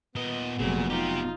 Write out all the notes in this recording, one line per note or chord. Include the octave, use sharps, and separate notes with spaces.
A#2 B3 D#5
F1 A#2 F#3 C4 G#4
C4 D#4 F4 G4